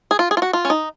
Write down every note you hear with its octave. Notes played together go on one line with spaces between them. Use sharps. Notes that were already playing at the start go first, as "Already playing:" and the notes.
G#4
F4
G#4
F4
F#4
F4
C#4
D#4